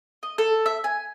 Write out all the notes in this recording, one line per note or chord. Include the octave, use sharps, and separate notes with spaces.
D#5
A4
E5
G#5